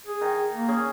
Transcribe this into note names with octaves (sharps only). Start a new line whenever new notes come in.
G#4
D#3
A#3
C#4 G#4 G#5